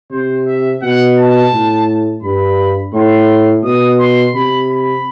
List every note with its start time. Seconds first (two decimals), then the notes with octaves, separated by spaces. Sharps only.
0.11 C3 C5
0.47 E5
0.82 B2 F#5
1.17 A5
1.52 A2
2.22 G2 B5
2.93 A2 C6
3.64 B2 D#6
3.99 C6
4.34 C3 B5
4.69 B5